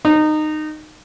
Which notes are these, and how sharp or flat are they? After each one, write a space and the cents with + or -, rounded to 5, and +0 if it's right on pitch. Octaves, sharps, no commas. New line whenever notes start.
D#4 -20